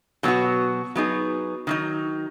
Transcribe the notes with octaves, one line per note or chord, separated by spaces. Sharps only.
B2 F#3 B3 F#4
F#3 B3 D#4 G#4
D#3 F#3 D#4